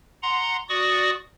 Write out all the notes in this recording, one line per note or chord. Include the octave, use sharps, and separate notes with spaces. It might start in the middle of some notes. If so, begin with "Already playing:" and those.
F#5 A#5 C6
F#4 D5 C#6 D#6